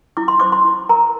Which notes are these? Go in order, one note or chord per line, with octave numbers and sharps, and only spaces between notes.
E4 D6
C6
C5 D6
C6
E4
A#4 A#5